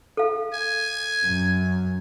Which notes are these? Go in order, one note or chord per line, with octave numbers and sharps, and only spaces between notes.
A4 F5
G#5
F#2